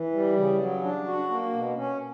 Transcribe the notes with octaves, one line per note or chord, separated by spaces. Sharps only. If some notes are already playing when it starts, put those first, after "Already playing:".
Already playing: E3
G3
C#3
F#3
D4
F#4
A#3
B2
C#4